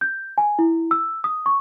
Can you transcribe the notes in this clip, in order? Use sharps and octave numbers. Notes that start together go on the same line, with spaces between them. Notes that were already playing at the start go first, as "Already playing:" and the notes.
G6
G#5
E4
E6
D#6
C#6